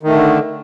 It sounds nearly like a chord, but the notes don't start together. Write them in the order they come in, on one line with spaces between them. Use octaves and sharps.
D#3 A3 D3